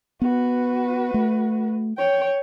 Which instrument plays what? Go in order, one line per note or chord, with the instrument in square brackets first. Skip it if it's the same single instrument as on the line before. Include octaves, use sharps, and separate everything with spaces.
[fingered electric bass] B3 [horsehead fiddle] F#4 B4
[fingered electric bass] A3
[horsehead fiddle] C#5 G5